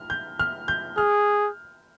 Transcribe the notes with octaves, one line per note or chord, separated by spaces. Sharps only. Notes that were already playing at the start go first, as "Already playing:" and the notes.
Already playing: F6
G6
F6
G6
G#4 F6